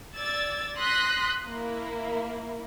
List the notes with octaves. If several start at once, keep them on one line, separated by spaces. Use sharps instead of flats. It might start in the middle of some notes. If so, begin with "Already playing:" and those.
D5 E6 G#6 A6
C6 D#6 F#6 A#6 B6
A#3 E4